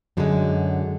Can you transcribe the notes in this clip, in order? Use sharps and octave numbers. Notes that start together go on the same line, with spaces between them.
F#2 D3 F#3 G#3